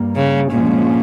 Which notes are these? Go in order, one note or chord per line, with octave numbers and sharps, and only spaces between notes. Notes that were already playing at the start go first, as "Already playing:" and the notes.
Already playing: G2 G3 A#3
C#3
G2 A#2 F3 G#3 C#4